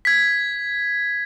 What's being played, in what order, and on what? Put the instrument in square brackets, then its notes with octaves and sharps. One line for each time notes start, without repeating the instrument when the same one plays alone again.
[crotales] G#6 B6